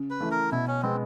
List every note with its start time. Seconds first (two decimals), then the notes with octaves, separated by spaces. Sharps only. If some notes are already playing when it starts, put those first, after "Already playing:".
Already playing: C#3
0.10 B4
0.21 E3 A3
0.31 A#4
0.52 B2 E4
0.68 C#4
0.82 G#3 B3 C4